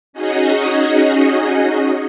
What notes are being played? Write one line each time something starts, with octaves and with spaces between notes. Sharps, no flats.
C#4 D#4 F#4 G#4 D#5